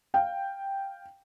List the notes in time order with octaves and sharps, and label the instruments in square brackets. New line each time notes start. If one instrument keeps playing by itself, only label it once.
[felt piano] F5 G5